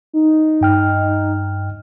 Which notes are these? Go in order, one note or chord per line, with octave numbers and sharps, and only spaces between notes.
D#4
G2 G5 F6